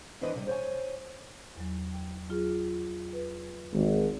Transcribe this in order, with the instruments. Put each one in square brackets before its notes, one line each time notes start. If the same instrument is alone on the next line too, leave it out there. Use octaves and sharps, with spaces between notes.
[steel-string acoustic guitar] D#2 E3 D4 B4 C5 D#5
C3 G3
C5 C#5 G#5
[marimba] E2 F#3
G5
F#3 F4 G#4
B4
[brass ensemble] G#1